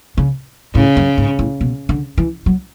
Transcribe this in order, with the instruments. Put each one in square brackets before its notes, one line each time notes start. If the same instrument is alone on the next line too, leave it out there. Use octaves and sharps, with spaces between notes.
[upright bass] C#3
[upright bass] A2 [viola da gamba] C#3
[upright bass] F#2
G#2
A2
B2
D3
E3
F#3